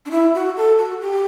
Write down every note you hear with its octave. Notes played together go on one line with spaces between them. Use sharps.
D4
E4
F#4
A4
F#4
G4